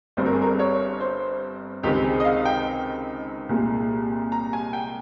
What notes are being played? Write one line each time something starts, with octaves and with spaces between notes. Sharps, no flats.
G1 G2 G3 C4 C5
A#4
G#4
A#4
C#5
C5
C#2 C3 D#3 G#3 C4 G4
G#4
D#5
F5
G5
C2 A#2 G#3
A#5
G#5
G5